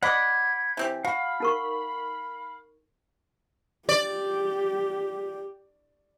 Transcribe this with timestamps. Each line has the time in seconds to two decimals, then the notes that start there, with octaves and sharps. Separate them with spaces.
0.03 D5 D#5 F#5 B5 D6 G#6
0.77 E3 C4 G4 C#5
1.05 F#4 F5 B5
1.40 D#4 A#4 C#6
3.89 G4 D5